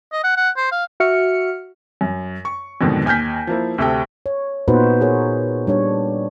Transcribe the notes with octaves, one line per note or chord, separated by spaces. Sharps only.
D#5
F#5
F#5
C5
F5
F#4 E5 F6 C#7
F#2
C#6
F2 G#2 B2 D3 D#3
D#2 G#5 F6 G6 B6
F3 A#3 E4
D2 C3 G4 A4 G5
C#5
A#2 B3 D#4 F#4 B4 C5
F#4 G#4 A#4 C#5
G3 D4 C#5